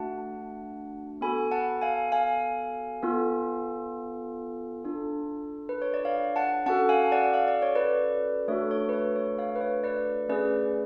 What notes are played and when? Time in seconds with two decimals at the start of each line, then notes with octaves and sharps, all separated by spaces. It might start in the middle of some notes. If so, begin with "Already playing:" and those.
Already playing: A3 D4 F#4 F#5 A5
1.21 B3 F#4 A4 G#5 B5
1.51 F#5 A5
1.82 F5 G#5
2.12 F5 G#5
3.03 B3 F4 A4
4.85 D4 F4 A4
5.69 B4
5.82 C#5
5.94 D5
6.05 C#5 F5
6.36 F#5 A5
6.66 C#4 F#4 A4 F#5 A5
6.89 F5 G#5
7.12 D5 F#5
7.34 F5
7.48 D5
7.62 C#5
7.75 B4 D5
8.48 A3 D4 F#4 A4 C#5
8.71 C#5
8.89 B4
8.93 C#5
9.16 C#5
9.39 C#5 F5
9.56 B4
9.61 C#5
9.83 B4 D5
10.29 A3 C#4 G#4 B4 D5